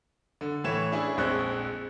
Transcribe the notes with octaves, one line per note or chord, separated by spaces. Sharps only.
D3
A2 E3 A3 C#5 E7
C#4 D4 E4 G#4
A#1 F2 G#3 C5 C#6 F#6